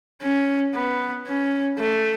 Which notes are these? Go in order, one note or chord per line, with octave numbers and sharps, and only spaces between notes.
C#4
B3
C#4
A3